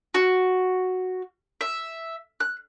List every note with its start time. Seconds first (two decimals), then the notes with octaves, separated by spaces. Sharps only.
0.14 F#4
1.61 E5
2.40 F#6